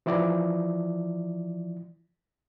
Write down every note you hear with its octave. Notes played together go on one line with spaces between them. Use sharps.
E3 F3 E4 D5